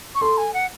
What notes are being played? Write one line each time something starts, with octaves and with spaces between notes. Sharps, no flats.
C#6
A4 C6
G#5
F#5